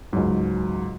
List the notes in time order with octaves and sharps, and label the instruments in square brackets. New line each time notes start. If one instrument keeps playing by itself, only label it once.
[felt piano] C#2 F#3 [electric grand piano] G#2